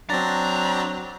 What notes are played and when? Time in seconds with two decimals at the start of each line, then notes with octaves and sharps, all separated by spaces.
0.10 F#3 C4 D4 A#5 A6